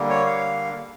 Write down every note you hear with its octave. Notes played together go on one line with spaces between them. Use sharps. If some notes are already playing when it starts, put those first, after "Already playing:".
Already playing: D3 G3 A#3
C#5
F5